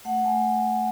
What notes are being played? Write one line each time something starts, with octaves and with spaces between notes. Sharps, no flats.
A3 F#5
A3 G#5